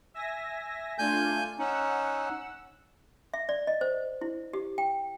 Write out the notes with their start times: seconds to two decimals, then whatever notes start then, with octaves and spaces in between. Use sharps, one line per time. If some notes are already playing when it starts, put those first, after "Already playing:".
0.14 E5 G#5 A#6
0.99 A3 D4 F4 G#5 G6
1.59 C#4 D#4 F#5 E6
3.34 E5
3.49 D5
3.67 D#5
3.81 C5
4.21 E4
4.53 G4
4.78 G5